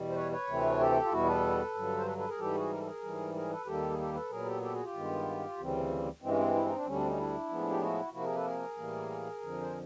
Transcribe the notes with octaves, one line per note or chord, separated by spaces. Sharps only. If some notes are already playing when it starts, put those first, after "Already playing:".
Already playing: E2 B2 G3
C5
B4 C#5
B4 C#5
D2 C3 E3 A3 C4
G4 A4
F4
E2 B2 G3 B3 E4 F#4
A4 B4
G2 D3 F#3
C5
A4 B4
A4 B4
G#4 A#4
G#2 E3 G3 G4 A4
F#4 G#4
A#4
A4
G#4 A#4
G#2 E3 G3
G#4 A#4
A4 B4
D#2 D#3 G3 A#3 G4 A4
G#4
G4 A4
A4 B4
A#2 F#3 B3 G#4 A#4
G4 A4
G4 A4
F#4 G#4
F4 G4
G2 D#3 G#3 B3
D2 C#3 E3 G3 C4
G2 E3 G#3 C4
C#4
C4
E4
D#4
D4
D2 D3 G3 C#4
C4 D4
C#4 D#4
D4 E4
A2 F3 G#3 B3
G4
E4 F#4
C3 F3 A#3 E4 F#4
G#4 A#4
A4 B4
G#4 A#4
A2 E3 G3 A#3
F2 D3 F3
C5